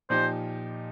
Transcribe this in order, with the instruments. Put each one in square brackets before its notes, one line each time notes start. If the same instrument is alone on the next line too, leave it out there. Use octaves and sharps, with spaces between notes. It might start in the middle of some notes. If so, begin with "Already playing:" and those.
[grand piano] A#2 F3 D#4 G4 [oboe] C5